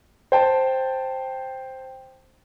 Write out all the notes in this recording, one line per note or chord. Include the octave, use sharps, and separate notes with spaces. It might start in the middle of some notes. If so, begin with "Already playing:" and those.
C5 G5 A5